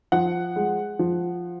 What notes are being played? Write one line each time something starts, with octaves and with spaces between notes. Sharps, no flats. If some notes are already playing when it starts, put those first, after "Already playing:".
F3 F#5
G#3
F3